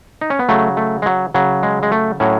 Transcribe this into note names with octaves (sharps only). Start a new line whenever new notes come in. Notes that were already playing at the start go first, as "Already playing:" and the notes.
D#4
C#4
B3
C#3 F#3 A3
A3
G#3
F#3
C#3 F#3
G#3
G#3
A3
A2 F#3 C#4